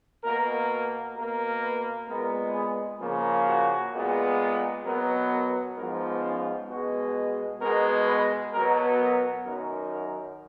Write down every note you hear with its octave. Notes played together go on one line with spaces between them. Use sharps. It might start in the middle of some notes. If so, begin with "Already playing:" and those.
B2 A#3 A#4
B2 A#3 A#4
B4
A#2 G#3 B3 A#4
G#4
C#3 F3 A#3
F#4
A#2 G#3 B3
B2 F#3 B3 A#4
A#4
G#2 F3 B3 A#4
C#4
B2 G#3 B3 F#4
B2 G#3 B3 A#4
B4
B2 F#3 B3 A#4
A#4
F#2 D#3 F#3 A#4
A#4